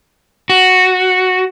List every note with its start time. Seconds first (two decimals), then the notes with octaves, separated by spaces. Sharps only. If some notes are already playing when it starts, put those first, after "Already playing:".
0.50 F#4